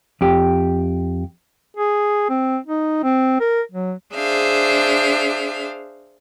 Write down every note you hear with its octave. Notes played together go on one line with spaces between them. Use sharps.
F2 G4
G#4
C4
D#4
C4
A#4
F#3
D4 G#4 C5 E5 F5